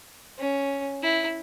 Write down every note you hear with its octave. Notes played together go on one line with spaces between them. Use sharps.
C#4
E4